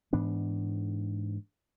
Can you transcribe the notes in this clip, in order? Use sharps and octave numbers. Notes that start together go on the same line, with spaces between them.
G#2 E3 B3 D4